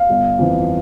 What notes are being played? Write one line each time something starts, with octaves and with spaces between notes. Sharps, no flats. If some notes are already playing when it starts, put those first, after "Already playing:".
Already playing: F5
G1
F2 E3